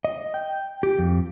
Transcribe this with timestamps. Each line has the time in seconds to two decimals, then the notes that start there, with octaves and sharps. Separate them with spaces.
0.05 D#5
0.34 G5
0.83 G4
0.98 F2